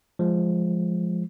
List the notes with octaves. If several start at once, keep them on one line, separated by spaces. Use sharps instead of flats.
F3 G#3